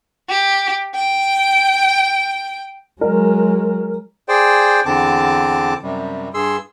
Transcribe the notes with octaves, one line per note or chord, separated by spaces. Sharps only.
G4
G5
F#3 G#3 A#4
G#4 C5 D5 G5
E2 D3 C4 A5 D6
F#2 C3 G3
G2 G#4 C6 E6